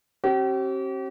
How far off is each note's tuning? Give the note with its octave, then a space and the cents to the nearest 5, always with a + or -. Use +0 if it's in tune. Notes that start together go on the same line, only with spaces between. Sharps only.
C4 +45 G4 -40